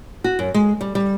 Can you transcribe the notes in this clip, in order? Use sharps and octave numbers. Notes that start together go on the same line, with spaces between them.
F#4
F#2
G#3
G3
G3